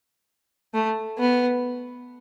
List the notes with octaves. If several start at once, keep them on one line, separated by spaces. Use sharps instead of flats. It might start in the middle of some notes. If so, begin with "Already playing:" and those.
A3
B3